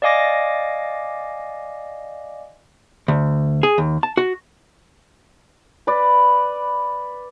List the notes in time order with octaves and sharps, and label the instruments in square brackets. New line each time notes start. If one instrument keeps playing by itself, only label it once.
[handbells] D5 D#5 F5 G#5 D6 A#6
[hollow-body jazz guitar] D2
G#4
D#2
A5
F#4
[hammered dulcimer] B4 D5